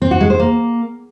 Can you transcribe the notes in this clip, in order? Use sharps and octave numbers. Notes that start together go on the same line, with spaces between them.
C4
F#4
G#3
C5
A#3